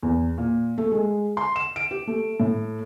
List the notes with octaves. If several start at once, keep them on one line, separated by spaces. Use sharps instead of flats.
E2
A#2
A3
G#3
C6
E7
D7
G4
A3
A2